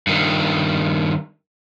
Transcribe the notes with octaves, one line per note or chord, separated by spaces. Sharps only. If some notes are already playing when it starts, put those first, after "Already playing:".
G2 D#3